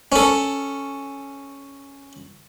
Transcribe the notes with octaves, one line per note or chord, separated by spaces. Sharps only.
C#4 A4